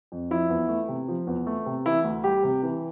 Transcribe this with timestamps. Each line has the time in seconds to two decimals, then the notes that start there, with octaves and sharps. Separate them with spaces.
0.12 F2
0.31 F3 E4
0.49 E2
0.69 A3
0.88 C3
1.08 F3
1.27 E2
1.47 A3
1.66 C3
1.85 E3 E4
2.04 D2
2.24 G3 G4
2.43 C3
2.63 E3